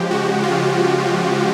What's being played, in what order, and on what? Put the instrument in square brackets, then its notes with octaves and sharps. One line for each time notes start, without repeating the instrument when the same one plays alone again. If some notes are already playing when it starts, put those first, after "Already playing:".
Already playing: [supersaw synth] C#3 F3 G#3 G4
F#4
F4